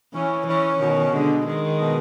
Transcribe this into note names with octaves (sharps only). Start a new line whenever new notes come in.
E3 C#4
E3 C#4
B2 D#3
D3 G#3
D#3 G#3
B2